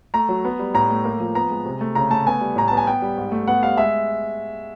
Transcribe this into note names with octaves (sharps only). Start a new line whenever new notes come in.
A3 A#5
F#3
B3
G3
A2 A#5
A3
A#3
F3
B3 A#5
G#3
C3
A3
C#3 A#5
A3 A5
B3 G#5
G3
A2 A#5
B3 A5
G#5
B3 G5
G3
G#2
A3
B3 F#5
G3 F5
G#3 E5